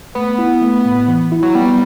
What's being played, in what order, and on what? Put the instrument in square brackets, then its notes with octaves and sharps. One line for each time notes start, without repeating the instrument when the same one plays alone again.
[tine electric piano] A3 [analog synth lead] B3
[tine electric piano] E4
A3
A2
E3
E4
[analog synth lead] F#3
[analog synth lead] G3 [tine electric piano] B3